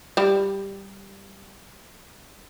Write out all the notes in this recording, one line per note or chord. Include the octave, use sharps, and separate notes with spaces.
G3 G4